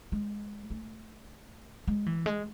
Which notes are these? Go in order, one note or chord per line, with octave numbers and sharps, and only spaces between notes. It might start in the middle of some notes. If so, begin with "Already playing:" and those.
G#3
A3
G#3
E3
G#3